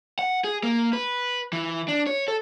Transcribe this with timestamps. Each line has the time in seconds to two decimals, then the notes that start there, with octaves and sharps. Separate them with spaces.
0.19 F#5
0.44 G#4
0.63 A#3
0.93 B4
1.53 E3
1.88 D4
2.07 C#5
2.28 A4